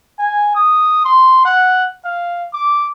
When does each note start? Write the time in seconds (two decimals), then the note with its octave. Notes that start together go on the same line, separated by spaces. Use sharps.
0.18 G#5
0.56 D#6
1.05 C6
1.45 F#5
2.04 F5
2.54 D6